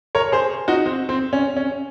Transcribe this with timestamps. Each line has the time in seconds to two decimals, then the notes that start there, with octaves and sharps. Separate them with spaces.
0.15 A#4 C#5
0.32 G#4 C5
0.68 D#4 F#4
0.86 C4
1.09 C4
1.33 C#4
1.57 C#4